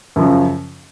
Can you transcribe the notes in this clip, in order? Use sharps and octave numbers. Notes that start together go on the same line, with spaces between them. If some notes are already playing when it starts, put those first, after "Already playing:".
F#2 C#3 F3